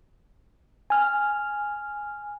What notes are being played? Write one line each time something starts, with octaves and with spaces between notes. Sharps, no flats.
G#5 F6